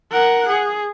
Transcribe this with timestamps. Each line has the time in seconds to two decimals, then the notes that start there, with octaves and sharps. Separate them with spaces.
0.11 A#4 F#5
0.49 G#4